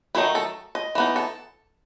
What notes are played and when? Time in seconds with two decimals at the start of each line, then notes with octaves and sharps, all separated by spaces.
0.15 D#3 F#3 A3 D#4 E4
0.35 A4
0.75 D#5
0.95 E3 B3 D#4
1.16 A4